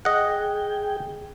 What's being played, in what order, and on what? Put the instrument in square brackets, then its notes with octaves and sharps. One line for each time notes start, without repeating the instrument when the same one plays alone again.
[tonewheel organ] G#4 G5 [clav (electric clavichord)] D#5 F#5